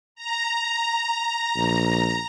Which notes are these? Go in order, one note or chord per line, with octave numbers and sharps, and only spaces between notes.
A#5
A#1